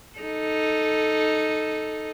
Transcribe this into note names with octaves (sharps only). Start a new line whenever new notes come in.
D#4 A4